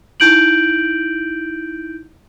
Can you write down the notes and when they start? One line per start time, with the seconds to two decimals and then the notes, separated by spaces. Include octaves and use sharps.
0.20 D#4 E4 G6 D7 F#7